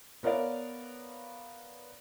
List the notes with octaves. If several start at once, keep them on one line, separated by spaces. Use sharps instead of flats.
B3 A#4 C#5 D5 F5